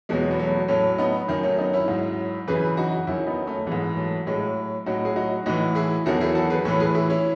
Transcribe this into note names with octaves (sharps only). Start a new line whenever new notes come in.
E2 B2 F#3 G#3
B3
F#3 A3
A2 F#3 A3 C#4
B3 D#4
F#2 D#3 F#3
A3 C#4
B3 D#4
C#4 E4
G#2 F#3
F#2 C#3 E3 G#4 B4
D#4 F#4
F#2 D#3 F#3 C#4 E4
B3 D#4
A3 C#4
G#2 E3 G#3 B3
F#3 A3
A2 F#3 G#3
A2 F#3 D#4 F#4
G#4
D#4 F#4
A2 E3 D#4 F#4
E4 G#4
E2 D#3 F#3 F#4 A4
E4 G#4
F#4 A4
G#4 B4
A2 E3 A4 C#5
G#4 B4
E4 G#4
C#4 E4